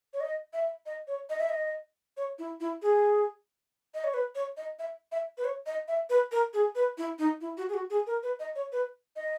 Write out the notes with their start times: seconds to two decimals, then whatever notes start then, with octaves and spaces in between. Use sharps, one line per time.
0.14 C#5
0.20 D#5
0.53 E5
0.86 D#5
1.08 C#5
1.30 D#5
1.39 E5
1.49 D#5
2.17 C#5
2.39 E4
2.60 E4
2.82 G#4
3.94 D#5
4.04 C#5
4.14 B4
4.35 C#5
4.57 D#5
4.79 E5
5.12 E5
5.38 B4
5.44 C#5
5.66 D#5
5.88 E5
6.10 B4
6.32 A#4
6.54 G#4
6.75 B4
6.98 E4
7.19 D#4
7.41 E4
7.57 F#4
7.69 G#4
7.74 F#4
7.90 G#4
8.07 A#4
8.23 B4
8.40 D#5
8.56 C#5
8.72 B4
9.16 D#5